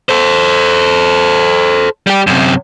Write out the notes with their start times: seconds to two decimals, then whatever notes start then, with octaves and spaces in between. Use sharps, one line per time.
0.09 A4 C5
2.07 G3 G4
2.27 F#2 C3